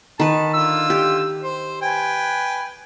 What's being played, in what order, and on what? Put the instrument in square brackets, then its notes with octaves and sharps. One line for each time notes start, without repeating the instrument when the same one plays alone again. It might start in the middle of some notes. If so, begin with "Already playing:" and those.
[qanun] D#3 B4 [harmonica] A5
[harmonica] D3 F4 E6
[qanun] G4
[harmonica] C5
B4 G5 G#5